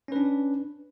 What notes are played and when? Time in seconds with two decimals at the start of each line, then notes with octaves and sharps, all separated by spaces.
0.08 C#4
0.12 B4
0.16 D4